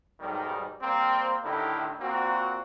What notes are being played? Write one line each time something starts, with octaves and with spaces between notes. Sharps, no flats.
B1 G#2 D#3 G3
G3 A#3 C4
A2 D3 D#3 E4 G4
A#2 A#3 C4 F#4